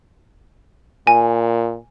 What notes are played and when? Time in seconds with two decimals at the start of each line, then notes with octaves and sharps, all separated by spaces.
1.07 A#2 G#5